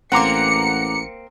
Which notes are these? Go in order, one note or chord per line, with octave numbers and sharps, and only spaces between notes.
A1 A#3 C4 F#5 A#5 D6 C#7